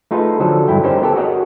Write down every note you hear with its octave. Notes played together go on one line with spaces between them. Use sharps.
A3 D#4 F4 G#4 A4 B4
D3 F3 F#3 A4
G2 D3 E4 G5
C#4 D#4 G4 A#4 C5
B3 G4 A4
F#4 G#4 A#4 C#5 D#5 F#5